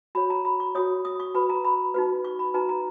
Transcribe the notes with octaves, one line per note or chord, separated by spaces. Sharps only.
F#4 C#5 B5
A#5
B5
C#6
F#4 C#5 D#6
D#6
C#6
F#4 B4 B5
A#5
B5
D#4 F#4 B4
C#6
B5
D#4 F#4 B4 A#5
A#5